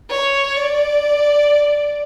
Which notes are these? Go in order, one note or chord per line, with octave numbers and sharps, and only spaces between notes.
C#5
D5